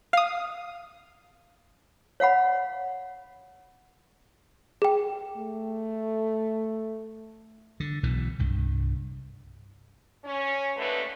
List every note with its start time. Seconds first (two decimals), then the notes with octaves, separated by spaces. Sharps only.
0.13 F5 D#6
2.20 C#5 F5 F#5 B5
4.82 G#4 G5
5.37 A3
7.80 D3
8.03 B1 B2 E3
8.39 C2 G2
10.24 C#4
10.77 D#2 D3 A3 B4